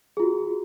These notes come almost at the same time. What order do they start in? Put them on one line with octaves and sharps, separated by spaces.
G#4 F4 F#4